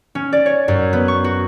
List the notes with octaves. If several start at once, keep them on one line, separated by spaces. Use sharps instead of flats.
C#4
D5
C#5
F#2
B3
C#6
F#4